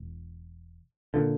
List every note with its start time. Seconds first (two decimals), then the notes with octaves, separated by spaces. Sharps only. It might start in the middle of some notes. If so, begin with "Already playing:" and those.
Already playing: E1
1.14 A#2 D3